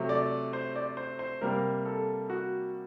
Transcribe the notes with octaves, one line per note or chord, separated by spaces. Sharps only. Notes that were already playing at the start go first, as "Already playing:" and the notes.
Already playing: C3 F#3 A3
D5
C5
D5
C5
C5
C3 G3 A#3 A#4
A4
F#4